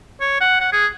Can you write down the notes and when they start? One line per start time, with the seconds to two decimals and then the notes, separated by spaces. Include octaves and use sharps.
0.21 C#5
0.41 F#5
0.60 F#5
0.73 G#4